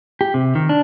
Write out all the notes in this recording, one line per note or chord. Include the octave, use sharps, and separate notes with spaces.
G4
C3
D#3
D4